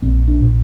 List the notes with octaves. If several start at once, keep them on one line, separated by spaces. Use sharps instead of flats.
A#1 C4
D4
A#2